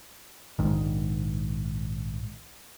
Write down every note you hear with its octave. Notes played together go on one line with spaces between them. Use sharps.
A#1 G#2 D#3